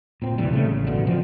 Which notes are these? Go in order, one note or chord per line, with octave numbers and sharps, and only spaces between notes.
A#2 C4
D#2 C3 E3 G3
C#3 A3
A1
F1 B2 D3
F3 C4